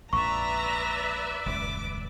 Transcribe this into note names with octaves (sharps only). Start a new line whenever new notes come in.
A#1 F2 G#2 B4 D5 E5 A#5 C#6
D#1 C#2 F#2 D6